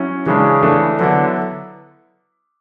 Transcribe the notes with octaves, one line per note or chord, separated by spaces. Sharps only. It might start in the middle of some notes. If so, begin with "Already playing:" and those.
Already playing: F#3 C#4 E4
C#3 E3 G#3 D4
E3 A3 D4
D3 F#3 B3 E4